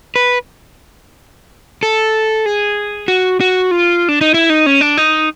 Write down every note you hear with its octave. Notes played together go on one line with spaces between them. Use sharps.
B4
A4
G#4
F#4
F#4
F4
D4
D#4
E4
D#4
C#4
D4
D#4